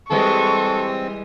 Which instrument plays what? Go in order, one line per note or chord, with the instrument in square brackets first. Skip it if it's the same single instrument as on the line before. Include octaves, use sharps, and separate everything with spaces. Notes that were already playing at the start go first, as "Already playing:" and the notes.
[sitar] E3 G3 G#3 [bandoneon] C4 [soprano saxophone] A4 [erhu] C#6